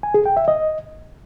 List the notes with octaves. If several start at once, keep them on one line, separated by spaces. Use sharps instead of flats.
G#5
G#4
G5
E5
D#5